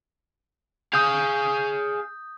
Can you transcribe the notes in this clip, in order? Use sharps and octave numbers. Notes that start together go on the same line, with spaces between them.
G#4 F5 D#6 G6